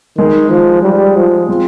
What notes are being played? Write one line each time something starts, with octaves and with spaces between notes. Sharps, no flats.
D#3 G#3 D#4 G#4
F3
G3
F3
G#3 C4 F4